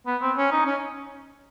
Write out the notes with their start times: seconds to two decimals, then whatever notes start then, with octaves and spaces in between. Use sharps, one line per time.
0.07 B3
0.22 C4
0.37 C#4
0.52 D#4
0.66 C#4